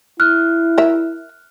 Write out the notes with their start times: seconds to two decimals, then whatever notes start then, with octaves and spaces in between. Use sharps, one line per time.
0.20 E4 F6 F#6
0.78 A#4 E5